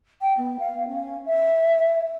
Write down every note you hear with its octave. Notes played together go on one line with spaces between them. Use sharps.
G5
B3
F5
C#4
E5